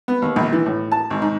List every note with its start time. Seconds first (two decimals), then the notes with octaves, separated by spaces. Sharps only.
0.08 B3
0.22 D#2
0.36 A#1
0.52 E3
0.66 A2
0.92 A5
1.10 G#1
1.22 G#2